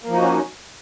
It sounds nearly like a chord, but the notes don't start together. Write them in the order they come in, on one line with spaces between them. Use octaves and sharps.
A#3 F3 D#4 F#4 C#4